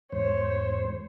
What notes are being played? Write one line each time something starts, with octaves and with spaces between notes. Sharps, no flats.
E2 G#2 C5 C#5